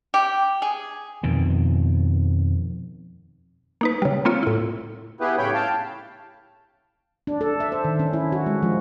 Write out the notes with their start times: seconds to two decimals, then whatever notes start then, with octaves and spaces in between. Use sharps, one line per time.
0.14 G4
0.62 G#4
1.23 F2 B2 D#3
3.81 A#3 D#4 B4
4.02 C#3 G3
4.25 A#3 C4 F4 C#5
4.43 A2 E4
5.20 B3 E4 G4 G#4 B4
5.38 A2 C#3 G3 C#5 G5 B5
5.54 F5 G5 A5
7.27 D4
7.41 A4
7.60 E5
7.72 C5
7.85 D#3
7.99 C#4
8.13 E4
8.32 F#4
8.46 G#3
8.63 F3